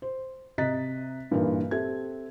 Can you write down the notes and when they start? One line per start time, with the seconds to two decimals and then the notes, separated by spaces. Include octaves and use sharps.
0.02 C5
0.58 C3 D#5 A#5 F#6 A6 B6
1.31 G2 A#2 E3 A#3 D#4 F4
1.71 C4 G4 A4 E5 G#6